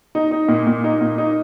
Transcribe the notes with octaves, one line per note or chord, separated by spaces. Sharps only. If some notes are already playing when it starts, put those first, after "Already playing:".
D#4
D#4
A#2
A#2
D#4
A#2
D#4